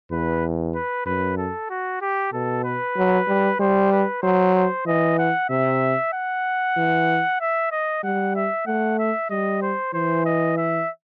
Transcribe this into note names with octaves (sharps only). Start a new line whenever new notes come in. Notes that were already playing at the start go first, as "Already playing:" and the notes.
E2 B4
B4
F#2 B4
A4
F#4
G4
B2 A4
B4
F#3
G3
G3 C5
B4
F#3 C5
C5
E3 D#5
F#5
C3 E5
F#5
E3
E5
D#5
G3 F#5
E5
A3 F#5
E5
G3 D#5
C5
E3 C5
D#5
E5